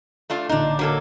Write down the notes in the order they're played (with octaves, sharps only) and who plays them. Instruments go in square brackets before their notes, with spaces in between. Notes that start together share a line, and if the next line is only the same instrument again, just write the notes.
[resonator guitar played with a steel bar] A3 D4 F4
[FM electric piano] A1 A#2 D3 [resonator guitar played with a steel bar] D4 D#4
[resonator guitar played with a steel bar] F#3 A#3 A4